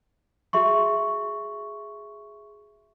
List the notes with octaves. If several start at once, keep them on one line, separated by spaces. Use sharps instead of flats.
F#4 G#4 E5 C6 C#6